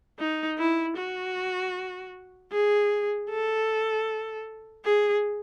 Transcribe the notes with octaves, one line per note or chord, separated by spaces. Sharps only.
D#4
E4
F#4
G#4
A4
G#4